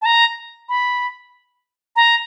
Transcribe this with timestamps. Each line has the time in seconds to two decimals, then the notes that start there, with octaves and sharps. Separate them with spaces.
0.02 A5
0.06 A#5
0.69 B5
1.96 A#5